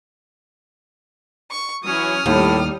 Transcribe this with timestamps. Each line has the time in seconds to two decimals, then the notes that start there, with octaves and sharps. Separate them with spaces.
1.51 C#6
1.84 E3 F#3 C#4 C#5 D#6 F6
2.26 D#2 A2 G3